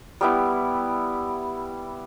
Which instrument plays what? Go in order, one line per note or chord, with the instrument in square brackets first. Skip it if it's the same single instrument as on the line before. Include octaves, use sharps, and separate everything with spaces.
[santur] G3 B3 E4